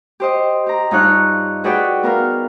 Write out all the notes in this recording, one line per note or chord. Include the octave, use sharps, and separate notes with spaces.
G4 C5 D#5
G4 A#5
G2 D#4 F4 C#5 F#6
F#4 G#4 B4 C#5 D5 G5
B3 A#4 F5